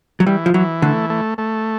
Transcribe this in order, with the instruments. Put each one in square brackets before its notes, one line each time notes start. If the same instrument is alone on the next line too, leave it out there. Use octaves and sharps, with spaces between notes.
[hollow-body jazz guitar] F#3
[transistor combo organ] E3 [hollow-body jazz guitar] G3
[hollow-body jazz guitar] F3
[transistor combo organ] E3 [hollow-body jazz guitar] F#3
[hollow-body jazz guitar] D3 [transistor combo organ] A3
[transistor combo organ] A3
A3